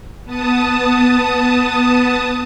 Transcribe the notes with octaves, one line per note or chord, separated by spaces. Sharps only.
B3 A5 D#6